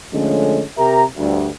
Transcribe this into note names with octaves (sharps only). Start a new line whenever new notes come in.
D3 F3 G#3 A3 C#4
C3 G4 A#4 E5 A#5
D2 G2